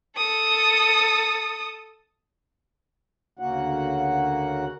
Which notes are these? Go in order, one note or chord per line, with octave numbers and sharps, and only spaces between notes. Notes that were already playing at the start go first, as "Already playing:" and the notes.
A4 D#6
D2 C#3 A#3 F#4 F#5